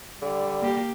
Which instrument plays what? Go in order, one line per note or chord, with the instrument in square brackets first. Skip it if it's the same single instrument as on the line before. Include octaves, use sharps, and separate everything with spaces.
[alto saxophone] D3 [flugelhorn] G3
[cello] A#3 G4